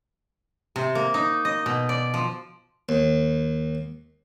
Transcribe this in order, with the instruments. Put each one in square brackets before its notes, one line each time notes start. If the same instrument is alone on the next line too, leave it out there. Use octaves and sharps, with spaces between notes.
[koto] C3
A#3
D#4
D#5
B2
D5
F3
[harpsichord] D#2